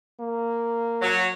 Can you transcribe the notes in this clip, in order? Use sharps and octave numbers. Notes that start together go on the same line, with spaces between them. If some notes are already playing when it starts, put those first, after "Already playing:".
A#3
F#3